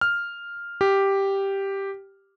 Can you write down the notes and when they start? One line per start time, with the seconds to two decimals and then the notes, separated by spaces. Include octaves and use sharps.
0.01 F6
0.81 G4